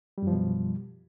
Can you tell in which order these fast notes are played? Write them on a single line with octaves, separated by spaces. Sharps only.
G3 F#2 F3 B2